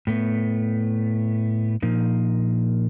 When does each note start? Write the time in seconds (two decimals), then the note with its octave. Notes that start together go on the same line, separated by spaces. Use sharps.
0.07 A2 A3 B3
1.82 A#2 F3 A#3 D#4